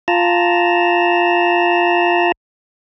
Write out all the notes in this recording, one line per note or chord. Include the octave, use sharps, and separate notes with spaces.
F4 A5 A#5